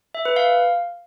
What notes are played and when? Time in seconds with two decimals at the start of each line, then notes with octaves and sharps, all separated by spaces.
0.15 E5
0.25 B4
0.36 F5